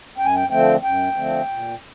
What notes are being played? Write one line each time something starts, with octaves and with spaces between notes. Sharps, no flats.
F#2 G5
G#5
G5
D3 F3 A3 C4 G5
F#2 G5
D3 F3 A3 C4
A#2